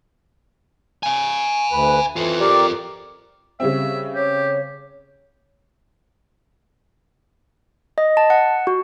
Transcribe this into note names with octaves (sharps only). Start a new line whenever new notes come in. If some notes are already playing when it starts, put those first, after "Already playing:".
F5 G#5
D2 B4
E3 F4 A4
G4 A#4 D5
C#3 G3 C4 E5
G4 C#5
D#5
A5
F#5
F#4